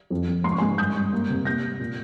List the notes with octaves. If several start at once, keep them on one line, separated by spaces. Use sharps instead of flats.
F2
F2
G#2 C6
C#6
G#5 C6
G#2
G2 D#6 G6
G2
A#3
C3
A#3 G6 A#6
A#3
A#2